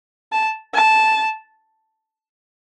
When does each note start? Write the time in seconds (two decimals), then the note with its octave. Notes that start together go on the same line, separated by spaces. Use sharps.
0.32 A5
0.74 A5